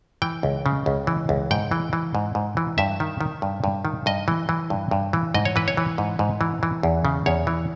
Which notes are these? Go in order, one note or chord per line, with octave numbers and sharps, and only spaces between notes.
E3 G5
C#2
C#3
C#2
E3
C#2
G#2 G5
E3
E3
G#2
G#2
E3
G2 E5
D#3
D#3
G2
G2
D#3
G2 D#5
E3
E3
G2
G2
E3
G#2 D#5
C#5
E3 B4
C#5
E3
G#2
G#2
E3
E3
E2
C#3
E2 C#5
E3